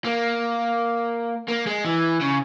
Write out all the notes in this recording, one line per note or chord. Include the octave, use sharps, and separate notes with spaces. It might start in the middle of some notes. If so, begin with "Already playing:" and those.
A#3
A#3
G#3
E3
C#3